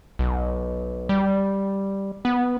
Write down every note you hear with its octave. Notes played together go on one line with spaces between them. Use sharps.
B1
G3
B3